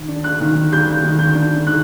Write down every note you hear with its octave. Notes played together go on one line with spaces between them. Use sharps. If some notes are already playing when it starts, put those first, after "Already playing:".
Already playing: D#3
D4
F#6
D#3
G3 G6
D#3
G6
D4
D#3 F#6